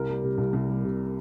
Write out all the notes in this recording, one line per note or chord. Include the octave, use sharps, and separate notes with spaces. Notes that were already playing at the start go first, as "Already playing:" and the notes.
Already playing: C2 A#4
G3
C3
C2
C2
G3
C3